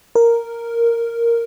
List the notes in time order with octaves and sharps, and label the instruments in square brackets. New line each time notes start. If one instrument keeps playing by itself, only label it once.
[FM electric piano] A#4